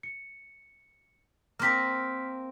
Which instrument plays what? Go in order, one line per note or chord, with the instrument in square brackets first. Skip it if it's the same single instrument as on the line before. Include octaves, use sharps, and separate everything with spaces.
[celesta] C#7
[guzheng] A#3 C4 A#4 [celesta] F6 B6